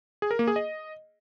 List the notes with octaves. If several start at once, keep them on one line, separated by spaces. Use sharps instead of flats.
G#4
A#4
A#3
G#4
D#5